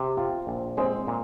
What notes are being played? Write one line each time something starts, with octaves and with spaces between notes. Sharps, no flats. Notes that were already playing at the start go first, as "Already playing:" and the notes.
Already playing: C3
C4 F4
A#1
G#3 C4
A#2